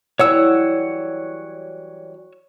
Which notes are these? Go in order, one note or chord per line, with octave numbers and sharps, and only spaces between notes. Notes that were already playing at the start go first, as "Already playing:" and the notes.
E3 F#3 G3 C#5 F#5 E6